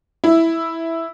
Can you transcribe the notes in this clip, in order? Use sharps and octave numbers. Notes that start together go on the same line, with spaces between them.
E4